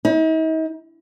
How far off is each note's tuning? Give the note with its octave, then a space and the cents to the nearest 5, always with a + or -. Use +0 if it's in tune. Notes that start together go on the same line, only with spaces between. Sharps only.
D#4 +45